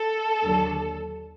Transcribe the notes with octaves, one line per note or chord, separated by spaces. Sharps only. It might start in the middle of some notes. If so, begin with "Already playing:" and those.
Already playing: A4
D#2 D3 F#3